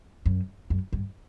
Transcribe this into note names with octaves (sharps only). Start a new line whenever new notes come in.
F#2
F#2
G2